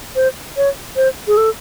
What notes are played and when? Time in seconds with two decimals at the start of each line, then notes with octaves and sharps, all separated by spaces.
0.16 C5
0.57 C#5
0.96 C5
1.27 G#4
1.37 A4